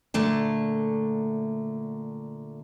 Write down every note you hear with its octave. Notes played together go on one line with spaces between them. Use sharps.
A#2 D3 A3